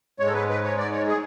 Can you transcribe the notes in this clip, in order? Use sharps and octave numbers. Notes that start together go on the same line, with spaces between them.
G#2 G#3 C#5
A4
B4
B4
C#5
D5
C#5
G#4